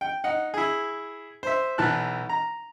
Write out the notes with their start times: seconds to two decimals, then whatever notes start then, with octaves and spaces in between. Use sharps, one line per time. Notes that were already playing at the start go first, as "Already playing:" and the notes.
0.01 G5
0.24 D#4 F#5
0.54 E4 G#4
1.43 C5 E5
1.78 B1 E3 A5 F#6
2.29 A#5